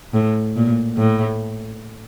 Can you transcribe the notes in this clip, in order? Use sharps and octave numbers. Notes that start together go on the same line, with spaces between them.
A2
A#2
A2